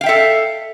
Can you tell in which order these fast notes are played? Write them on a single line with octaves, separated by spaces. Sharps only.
F5 G5 E5 A4